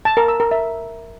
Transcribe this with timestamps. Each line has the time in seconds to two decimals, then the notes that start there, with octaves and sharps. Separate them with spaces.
0.05 A5
0.17 A#4
0.28 E6
0.40 A#4
0.51 E5